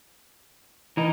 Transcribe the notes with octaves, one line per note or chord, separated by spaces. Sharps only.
E3 D#4